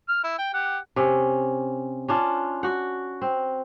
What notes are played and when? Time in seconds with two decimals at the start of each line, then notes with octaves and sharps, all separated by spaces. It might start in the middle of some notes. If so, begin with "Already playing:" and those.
0.09 F6
0.24 E4
0.39 G5
0.54 G4 F#5
0.96 C3 C#4
2.08 C#4 D4 F4
2.63 F#4 F#5
3.22 C4